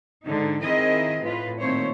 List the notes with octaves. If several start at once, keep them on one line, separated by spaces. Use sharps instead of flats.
G#2 D3 D#4
D#3 C4 E4 G#4 A#4 D#5
A2 F4 B4
A#2 D#3 A3 C4 C5 C#5